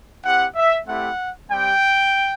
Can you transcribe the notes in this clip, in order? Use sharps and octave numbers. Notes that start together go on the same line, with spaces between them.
C4 E4 G4 F#5
E5
A3 C4 E4 G4 F#5
G3 C4 G4 G5